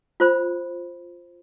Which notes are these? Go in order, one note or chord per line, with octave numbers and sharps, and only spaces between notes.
F4 C5 B5